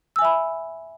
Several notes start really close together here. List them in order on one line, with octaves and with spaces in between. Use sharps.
E6 G#5 E5 B5